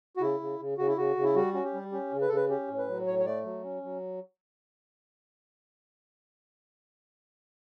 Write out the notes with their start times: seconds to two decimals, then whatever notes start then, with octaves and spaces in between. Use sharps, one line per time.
0.17 F#4
0.21 C#3 E4
0.40 C#3
0.59 C#3
0.78 C#3 F#4
0.88 E4
0.97 C#3 F#4
1.16 C#3
1.23 E4
1.35 G3 F#4
1.54 C#4 F#4
1.64 G4
1.74 G3
1.92 C#4 G4
2.12 C#3
2.21 B4
2.29 C#3 A4
2.36 B4
2.49 C#4 G4
2.68 A2
2.78 B4
2.88 F#3
3.06 A2 C#5
3.19 C#5
3.25 A3 D5
3.44 F#3
3.63 C#4
3.82 F#3